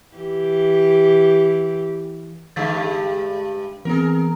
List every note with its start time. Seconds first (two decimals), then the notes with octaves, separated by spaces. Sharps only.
0.16 E3 G4
2.56 G2 D3 G#3 A6
3.85 E3 B3 C4 G#4 A#4